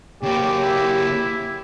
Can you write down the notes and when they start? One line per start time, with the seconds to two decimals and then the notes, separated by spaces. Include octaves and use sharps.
0.23 C#3 A#3 G4 D5
0.63 E4